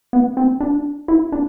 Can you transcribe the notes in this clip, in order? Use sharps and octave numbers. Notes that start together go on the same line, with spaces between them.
B3
C4
D4
E4
D4